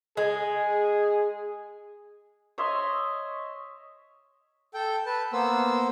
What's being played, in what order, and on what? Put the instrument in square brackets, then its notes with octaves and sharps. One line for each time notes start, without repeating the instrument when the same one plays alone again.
[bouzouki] G#3 [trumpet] G#4
[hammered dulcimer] C#5 D#5 E5 C6
[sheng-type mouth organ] A4 G5
B4 A5
A#3 B3 C5 E6